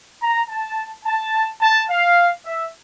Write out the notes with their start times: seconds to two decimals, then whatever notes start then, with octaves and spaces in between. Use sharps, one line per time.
0.22 A#5
0.49 A5
1.05 A5
1.62 A5
1.90 F5
2.45 E5